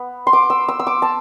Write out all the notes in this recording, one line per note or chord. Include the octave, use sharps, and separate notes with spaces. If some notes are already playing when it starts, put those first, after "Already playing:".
Already playing: B3
C6
D6
E6
E6
E6
D6
A5